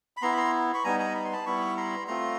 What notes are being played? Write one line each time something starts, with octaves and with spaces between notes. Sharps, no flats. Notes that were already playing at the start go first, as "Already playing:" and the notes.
B5
B3 E4 A#5 C6
B5
A#5 C6
B5 C#6
G3 B3 D#4 G#5 A#5
G#5 A#5
B5
C6
A5 B5
G3 B3 E4 B5 C#6
A#5 C6
A3 C4 F4 A#5 C6